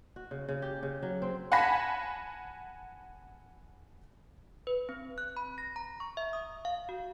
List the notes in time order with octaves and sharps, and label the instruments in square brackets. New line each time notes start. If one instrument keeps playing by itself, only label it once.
[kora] F#4
C#3
C#3
G4
C#3
F#3
C4
[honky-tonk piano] F#5 G#5 A5 B5 A#6 B6
[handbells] B4
C4
F#6
B5
A#6
A#5
C#6
E5
D#6
F5
F#4